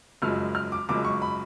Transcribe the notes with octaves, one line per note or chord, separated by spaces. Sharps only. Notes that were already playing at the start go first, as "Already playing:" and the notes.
F#1 F#2 F3 G#3 F6
F6
D6
F#1 F#2 F3 G#3 D6
C#6
B5